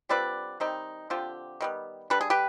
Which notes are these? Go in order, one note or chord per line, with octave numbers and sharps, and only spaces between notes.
D3 G3 C4 F4 B4 D5
D#3 G3 C4 D#4
D3 F3 C4 F4 G4
D#3 G3 B3
D3 G3 D4 B4
G#4
G4 B4